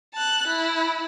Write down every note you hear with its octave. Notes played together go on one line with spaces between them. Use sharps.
A5 F#6
E4